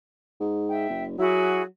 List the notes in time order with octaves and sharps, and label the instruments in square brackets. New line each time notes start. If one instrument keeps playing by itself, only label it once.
[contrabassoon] G#2
[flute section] E5 G5
[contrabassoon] F#1
[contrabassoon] F#3 [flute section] E4 F#4 G#4